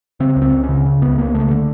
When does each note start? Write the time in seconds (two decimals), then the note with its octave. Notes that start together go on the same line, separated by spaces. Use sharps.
0.20 C#3 C4
0.36 C#2
0.42 C4
0.52 C#2
0.64 C#4
0.69 C#3
0.85 C#3
1.02 C#2 B3
1.18 C#2 A#3
1.34 C#3 A3
1.51 D3